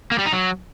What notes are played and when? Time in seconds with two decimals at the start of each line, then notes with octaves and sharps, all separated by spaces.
0.11 A#3
0.19 G3
0.26 D#4
0.33 F#3